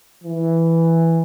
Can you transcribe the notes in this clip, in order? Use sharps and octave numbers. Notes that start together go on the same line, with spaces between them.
E3